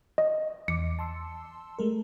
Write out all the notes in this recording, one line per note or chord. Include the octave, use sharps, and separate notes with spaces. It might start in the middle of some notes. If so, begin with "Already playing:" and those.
D#5
E2 D6 C#7
A5 C6 E6
G#3 A3 A#4